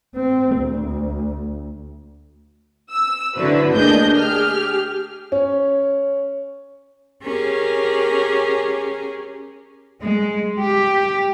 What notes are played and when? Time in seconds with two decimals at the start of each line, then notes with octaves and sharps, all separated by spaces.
0.15 C4
0.58 D2
2.91 E6
3.35 D3 F#3 E4 F#4 B4 C5
3.73 D2 A#3 D4 G#4 D#5 G6
4.17 G4 G#4 F6
5.32 C#4
7.23 C#4 G4 G#4 A#4
10.02 G#3
10.60 G4